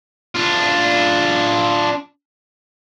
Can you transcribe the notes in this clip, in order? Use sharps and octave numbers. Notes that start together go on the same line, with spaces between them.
D4 F4